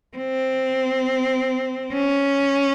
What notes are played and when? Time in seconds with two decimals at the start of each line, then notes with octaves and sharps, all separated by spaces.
0.17 C4
1.93 C#4